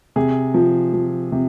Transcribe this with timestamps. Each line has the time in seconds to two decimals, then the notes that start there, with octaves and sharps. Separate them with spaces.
0.16 C3 G#4
0.54 F3
0.93 F3
1.32 C3